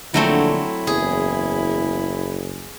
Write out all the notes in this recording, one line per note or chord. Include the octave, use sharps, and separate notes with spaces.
A#1 D3 F#3 A3 C4 E4
F#1 E2 G#4